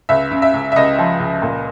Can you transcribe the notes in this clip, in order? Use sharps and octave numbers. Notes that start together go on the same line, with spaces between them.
C#2 E5
C#3
E5
C#2
E5
C#2 D#5
F3
C#2
A#2